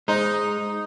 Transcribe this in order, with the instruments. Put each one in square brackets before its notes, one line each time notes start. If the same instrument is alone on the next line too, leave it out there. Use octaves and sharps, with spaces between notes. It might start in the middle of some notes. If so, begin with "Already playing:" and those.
[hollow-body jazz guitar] G#3 C5 [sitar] D#4